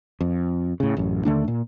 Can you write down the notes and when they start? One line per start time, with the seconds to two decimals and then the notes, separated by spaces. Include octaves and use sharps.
0.21 F2
0.80 A2 C#3
0.97 A1 F#2
1.25 D#2 D3 A3 D4
1.48 A#2